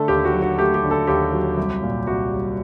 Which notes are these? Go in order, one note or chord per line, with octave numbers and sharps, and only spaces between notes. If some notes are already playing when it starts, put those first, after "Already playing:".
Already playing: D3 A3 A4
D#2 G4
F#4
F#3
F#4
A3 G4
G4
D3
A4
D#2 G4
F#3
C2
A#2
C2 F#4
G3